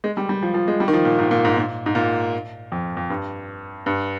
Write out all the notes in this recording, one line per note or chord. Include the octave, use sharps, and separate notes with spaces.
G#3
G3
G3
F3
F3
G#3
G3
D#3
F3
A#2
G#2
A#2
G#2
A#2
G#2
A#2
F2
F2
G2
G2